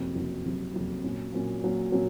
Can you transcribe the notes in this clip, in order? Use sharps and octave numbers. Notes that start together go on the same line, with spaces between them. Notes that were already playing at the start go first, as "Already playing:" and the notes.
Already playing: F#1 F2 C3 F#3
F#1 F2 C3 F#3
F#1 F2 C3 F#3
F#1 F2 C3 F#3
A#2 F#3 C#4
A#2 F#3 C#4
A#2 F#3 C#4
A#2 F#3 C#4